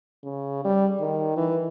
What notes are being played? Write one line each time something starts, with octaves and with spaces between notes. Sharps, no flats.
C#3
G3
D#3
E3